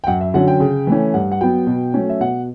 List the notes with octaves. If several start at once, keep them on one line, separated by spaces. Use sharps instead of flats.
G5
F#2 F#5
E5
D3 F#3 C#4 F#5
G5
C#3
E3 A3 C#4
G2 F#5
F#5
F#3 B3 G5
B2
F#3 A3 C#4
E5
B2 F#5